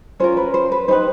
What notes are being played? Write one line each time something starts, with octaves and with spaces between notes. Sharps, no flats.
C#4 F4 A#4 C5
B4
C5
B4
D#4 G4 B4 C5